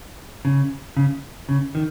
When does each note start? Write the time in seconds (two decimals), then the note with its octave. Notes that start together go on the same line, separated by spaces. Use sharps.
0.45 C#3
0.97 C#3
1.49 C#3
1.75 D#3